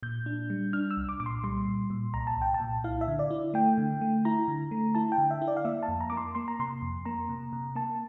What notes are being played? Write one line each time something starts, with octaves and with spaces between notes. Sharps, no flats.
A#2 G6
D4
G3
D4 F6
E6
C2
D6
A#2 D6
C6
G3 C6
A#2
A#2
C2 A#5
A5
C2 G5
A5
A#2
E4 F5
E5
D3
D5
E4
A3 G5
D3
A3
E4 A#5
D3
A3
E4 A5
G5
D3
E5
E4
D5
F5
A#3 E5
A5
F2
A#5
A#3 D6
C6
A#3 C6
A#5
C3 C6
F2
A#3 A#5
C3
C3
A#3 A5